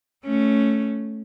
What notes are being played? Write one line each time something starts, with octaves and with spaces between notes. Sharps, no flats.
A3 C#4